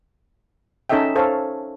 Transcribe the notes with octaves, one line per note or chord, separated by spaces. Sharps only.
C#4 D#4 A4 D#5 E5 G5
A4 C5 C#5 F5